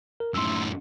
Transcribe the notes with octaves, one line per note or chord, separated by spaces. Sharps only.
A#4
F#2 A2 C6 E6